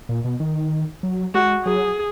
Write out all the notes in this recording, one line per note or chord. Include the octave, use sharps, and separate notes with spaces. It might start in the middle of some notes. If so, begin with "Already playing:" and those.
A#2
B2
D#3
F#3
G#3 F#4
F#3 G#4